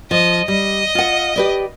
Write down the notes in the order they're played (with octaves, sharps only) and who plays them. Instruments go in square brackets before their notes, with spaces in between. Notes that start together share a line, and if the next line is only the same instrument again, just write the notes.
[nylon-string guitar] F3 [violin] D#5
[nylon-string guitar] G3 [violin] D#5
[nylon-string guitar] F4 F#5
G4 B4 D5